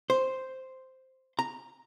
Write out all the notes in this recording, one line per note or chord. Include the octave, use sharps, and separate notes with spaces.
C5
A#5